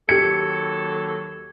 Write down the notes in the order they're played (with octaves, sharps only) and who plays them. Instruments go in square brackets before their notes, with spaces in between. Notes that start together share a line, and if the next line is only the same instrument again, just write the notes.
[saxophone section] D#2 F#3 A4 [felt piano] G4 C#7 [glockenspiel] G#6